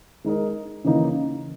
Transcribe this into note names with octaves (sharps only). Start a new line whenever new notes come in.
G#3 D#4 A#4 D#5
C#3 E3 A#3 D#4